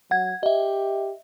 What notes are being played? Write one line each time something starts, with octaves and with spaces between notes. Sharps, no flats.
F#3 F#5 G#6
G4 D#5 E5